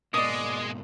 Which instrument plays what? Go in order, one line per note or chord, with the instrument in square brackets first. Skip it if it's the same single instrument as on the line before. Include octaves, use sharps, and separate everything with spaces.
[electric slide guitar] G#2 B2 A#3 [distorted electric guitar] G#3 [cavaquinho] D5 D#6 [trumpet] D#5